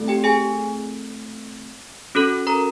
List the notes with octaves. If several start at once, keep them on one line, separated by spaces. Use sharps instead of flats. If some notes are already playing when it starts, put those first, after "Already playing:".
Already playing: A3 C4 E4 A4
G4 G5
G#4 G#5
C#4 F#4 A4
A#4 A#5